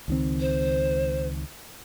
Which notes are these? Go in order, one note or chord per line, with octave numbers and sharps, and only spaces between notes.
C#2 D#3 C4
C5